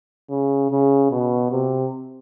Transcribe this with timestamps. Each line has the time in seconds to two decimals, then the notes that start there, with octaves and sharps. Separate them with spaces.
0.30 C#3
0.71 C#3
1.11 B2
1.51 C3